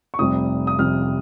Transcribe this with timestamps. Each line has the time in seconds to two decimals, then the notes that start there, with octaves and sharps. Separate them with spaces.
0.14 C#6
0.19 F1 F2 C3 G3 D#6
0.67 D#6
0.79 F1 F2 C3 G3 F6